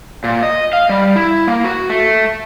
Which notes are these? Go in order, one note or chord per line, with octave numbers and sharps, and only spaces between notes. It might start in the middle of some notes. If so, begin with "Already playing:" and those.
A#2
D#5
F5
G3
E4
A#3
F#4
A3